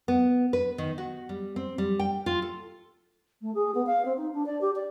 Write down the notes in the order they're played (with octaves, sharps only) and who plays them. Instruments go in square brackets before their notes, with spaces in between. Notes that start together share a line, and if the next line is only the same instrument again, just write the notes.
[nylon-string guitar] B3
B4
D#3
F#4
G3
C4
G3
G5
F4
A4
[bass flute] A3
G#4
B3
F5
C4
D#4
D4
D5
G4
D5